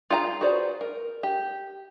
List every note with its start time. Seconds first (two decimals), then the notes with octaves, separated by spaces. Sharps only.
0.10 F4 G#4 G#5 A#5
0.41 F#4 G#4 B4 C5 D5
0.81 A#4
1.23 G4